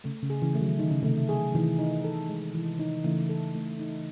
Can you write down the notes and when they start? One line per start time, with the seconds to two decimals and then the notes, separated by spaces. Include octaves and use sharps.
0.04 C#3 A3
0.23 C#3
0.30 G#4
0.42 C#3 E3
0.55 A3
0.61 D#3 F#3
0.79 D#3 D#4
0.91 C#3
1.03 C3 D#3 A3
1.29 G#4
1.54 C3 D#3 E3
1.79 D#4
2.04 A4
2.29 G#3
2.55 E3
2.79 D#4
3.04 C#3 E3 A3
3.29 A4
3.55 A3
3.80 D#4